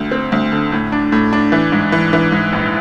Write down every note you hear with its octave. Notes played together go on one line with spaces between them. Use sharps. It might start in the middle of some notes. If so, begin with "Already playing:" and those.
Already playing: D2
C4
D2
D3
A2
D4
A2
D4
E3
G#2
E3
E3
G#2
A#1